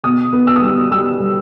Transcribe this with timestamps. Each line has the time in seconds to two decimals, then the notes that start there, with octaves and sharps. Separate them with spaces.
0.03 B2 D#6
0.33 B3
0.47 E6
0.56 D#6
0.62 G3 E6
0.91 G3 E6
1.20 G3